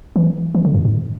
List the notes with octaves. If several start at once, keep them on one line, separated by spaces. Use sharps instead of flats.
E3
E3
D3
F#2
G#2